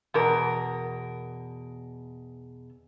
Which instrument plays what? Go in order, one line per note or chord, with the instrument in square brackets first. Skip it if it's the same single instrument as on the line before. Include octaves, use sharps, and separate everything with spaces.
[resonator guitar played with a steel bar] E2 B2 A#4